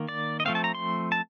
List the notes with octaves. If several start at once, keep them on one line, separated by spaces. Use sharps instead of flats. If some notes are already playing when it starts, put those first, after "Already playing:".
Already playing: D#3 A#3
D5
D#5
F3 A3 C4 F5
A5
A#5
C6
A5